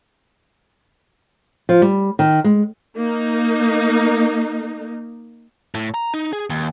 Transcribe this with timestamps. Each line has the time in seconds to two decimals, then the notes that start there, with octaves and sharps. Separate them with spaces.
1.69 F3
1.82 G3
2.19 D#3
2.44 G#3
2.96 A#3 D#4
5.75 A2
5.94 A#5
6.14 D#4
6.33 G#4
6.50 D#2